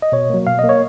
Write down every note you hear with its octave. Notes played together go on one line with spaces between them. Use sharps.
D#5
B2 C#5
F#3 A#3
B2 F5
D#5
A#3
C#5